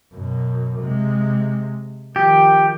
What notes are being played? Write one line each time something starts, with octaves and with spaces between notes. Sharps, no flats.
F#2 B2
C3 G#3
D#3 F3 G4